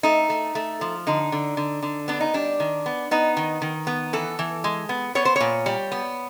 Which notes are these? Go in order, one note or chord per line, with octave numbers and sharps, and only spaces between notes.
A3 D#4
A3
A3
F3
D3 D#4
D3
D3
D3
B3 D4
D#4
G3 D4
D#3
B3
B3 D#4
D#3
D#3
B3
E3 A4
E3
G#3
B3
B3 C#5
C5
A#2 C#5
G3
B3